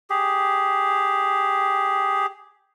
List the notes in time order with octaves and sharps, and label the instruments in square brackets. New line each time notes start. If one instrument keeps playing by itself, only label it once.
[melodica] G4 G#4